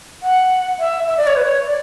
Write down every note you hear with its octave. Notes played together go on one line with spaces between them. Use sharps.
F#5
E5
E5
D5
C#5
B4
C#5
D5